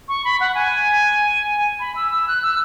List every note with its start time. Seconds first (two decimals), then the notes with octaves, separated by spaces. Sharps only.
0.09 C#6
0.25 B5
0.40 F#5
0.55 G#5
1.80 B5
1.96 E6
2.12 E6
2.28 F#6
2.42 E6